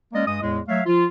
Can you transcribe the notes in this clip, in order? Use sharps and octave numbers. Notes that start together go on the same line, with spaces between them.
G#3 A#3 C#4 D5 D#5
G2 G#3 D#5 D#6
E2 A2 G#3
F#3 A3 C#5 E5 F5
F3 F4